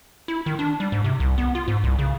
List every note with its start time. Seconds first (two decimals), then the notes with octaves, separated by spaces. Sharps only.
0.28 E4
0.46 D#3
0.59 D4
0.80 G3
0.92 G#2
1.04 C3
1.20 C2
1.38 B3
1.55 F4
1.68 G#2
1.84 C2
1.99 C#3